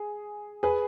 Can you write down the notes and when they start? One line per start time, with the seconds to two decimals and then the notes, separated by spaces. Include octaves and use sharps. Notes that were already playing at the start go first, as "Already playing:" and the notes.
Already playing: G#4
0.63 G#4 B4